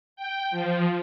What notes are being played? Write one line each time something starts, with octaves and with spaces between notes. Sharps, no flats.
G5
F3